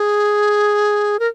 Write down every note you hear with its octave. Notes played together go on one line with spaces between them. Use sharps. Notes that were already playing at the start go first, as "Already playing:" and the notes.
Already playing: G#4
A#4